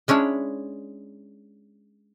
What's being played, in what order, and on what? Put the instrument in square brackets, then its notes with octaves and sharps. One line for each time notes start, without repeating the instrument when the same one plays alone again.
[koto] G#3 C#4 D4 E4 C#5